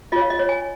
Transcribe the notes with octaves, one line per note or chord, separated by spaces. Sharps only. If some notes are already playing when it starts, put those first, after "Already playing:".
F4 C#5 D#5
F5
D#5
C#5
G#5